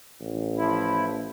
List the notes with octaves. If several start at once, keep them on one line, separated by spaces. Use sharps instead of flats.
A1
F3 E4